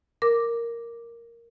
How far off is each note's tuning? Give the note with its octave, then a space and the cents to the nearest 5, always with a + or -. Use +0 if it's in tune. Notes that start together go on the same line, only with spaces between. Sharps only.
A#4 +0 D6 +0